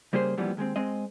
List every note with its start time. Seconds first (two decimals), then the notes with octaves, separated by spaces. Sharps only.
0.13 C#3 G3 A#3 G4 G#4 C5
0.37 F2 A#2 E3 F#3 G3 B3
0.57 D#2 G#3 A3 C4
0.76 G#3 C4 D#5